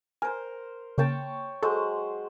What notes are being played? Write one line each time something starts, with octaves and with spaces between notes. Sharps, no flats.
A#4 C5 G#5
C#3 A#3 C#5 G5 A5
F#3 G#3 A4 C5